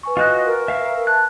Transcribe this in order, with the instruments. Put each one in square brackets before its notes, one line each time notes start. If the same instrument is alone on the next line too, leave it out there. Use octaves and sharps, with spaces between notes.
[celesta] B4 G#5 C#6
[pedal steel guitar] F4 F#4 F#6 [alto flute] D#5
[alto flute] A#4
[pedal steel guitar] E5 F5
[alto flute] A5 [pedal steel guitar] F#6